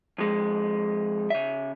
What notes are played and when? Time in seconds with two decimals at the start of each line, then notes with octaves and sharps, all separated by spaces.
0.18 F2 G#3
1.30 C#3 E5